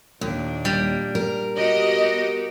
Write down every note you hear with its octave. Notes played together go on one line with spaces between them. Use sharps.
D#2 A#2 D4
G3
A#4
B3 F#4 G4 D#5